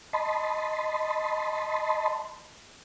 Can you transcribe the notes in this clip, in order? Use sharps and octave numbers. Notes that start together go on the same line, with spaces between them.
D#5 A5 B5 C6